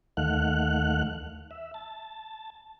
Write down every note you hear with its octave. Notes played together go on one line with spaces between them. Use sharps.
D#2 D#3 A3 F5 F#5 F#6
E5
A5